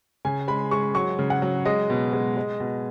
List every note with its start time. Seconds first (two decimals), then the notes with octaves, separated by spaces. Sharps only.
0.25 C#3 G#5
0.48 G#3 B5
0.71 G#3 C#6
0.95 F#3 C#6
1.19 C#3
1.30 F#5
1.42 F#3
1.65 G#3 D#5
1.90 B2
2.13 G#3
2.36 G#3
2.60 B2